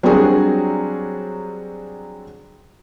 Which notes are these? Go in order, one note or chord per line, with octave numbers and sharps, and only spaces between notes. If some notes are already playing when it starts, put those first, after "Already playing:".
F#3 G3 C4 D4 F#4 G#4